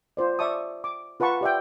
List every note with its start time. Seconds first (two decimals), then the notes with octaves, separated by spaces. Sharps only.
0.17 F4 C5 D5
0.39 D5 E5 A5 C#6 D#6
0.84 D6
1.20 F4 B4 F#5 A5 C#6
1.41 G4 D5 E5 G5